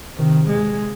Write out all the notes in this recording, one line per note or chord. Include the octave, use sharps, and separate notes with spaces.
C3 D#3
G#3